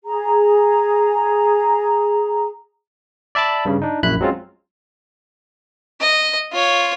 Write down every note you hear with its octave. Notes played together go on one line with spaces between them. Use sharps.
G#4 A#5
D5 E5 A5 B5 D6
G2 C#3
D4 D#4
A#1 F#2 E4 B5 F#6
F#3 G#3 C4 C#4 F4
D#5
F4 C#5